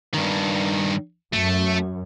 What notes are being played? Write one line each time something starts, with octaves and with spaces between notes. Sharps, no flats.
G2 D#3
F#2 A3